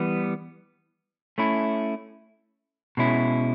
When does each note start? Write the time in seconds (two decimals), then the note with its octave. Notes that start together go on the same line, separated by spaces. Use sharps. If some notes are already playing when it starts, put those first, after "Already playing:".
Already playing: E3 G3 B3
1.38 A3 C#4 E4
2.97 B2 G#3 C#4 E4